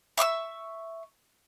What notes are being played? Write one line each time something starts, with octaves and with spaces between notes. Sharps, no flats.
E5 C#6 D6 E6